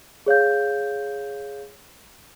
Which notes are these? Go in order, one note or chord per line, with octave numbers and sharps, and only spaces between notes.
G#4 C#5 F5 G6